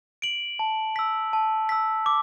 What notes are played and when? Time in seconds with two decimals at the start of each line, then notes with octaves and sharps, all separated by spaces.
0.22 D7 F#7
0.59 A5
0.96 E6 B6
1.33 A5
1.69 E6 B6
2.06 D6